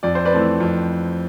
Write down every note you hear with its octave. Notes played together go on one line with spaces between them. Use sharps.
F2 D5
C5
B4 D5
E3 A3 C4
F2